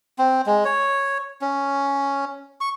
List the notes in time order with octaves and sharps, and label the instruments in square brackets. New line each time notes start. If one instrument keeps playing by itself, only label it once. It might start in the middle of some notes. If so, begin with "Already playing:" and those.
[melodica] C4
G#3
C#5
C#4
C#6